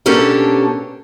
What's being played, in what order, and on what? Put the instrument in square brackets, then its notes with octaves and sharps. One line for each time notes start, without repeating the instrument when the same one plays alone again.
[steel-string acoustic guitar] B2 A#3 C#4 D4 G4 A4